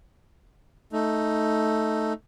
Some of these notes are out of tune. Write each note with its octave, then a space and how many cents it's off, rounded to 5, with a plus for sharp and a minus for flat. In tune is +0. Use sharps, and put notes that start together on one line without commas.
A3 +0 D#4 +0